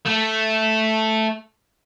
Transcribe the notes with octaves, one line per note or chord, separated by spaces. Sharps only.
A3